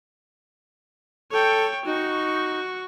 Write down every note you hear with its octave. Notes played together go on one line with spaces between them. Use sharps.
A4 C#5 G5
D#4 F#4 C#6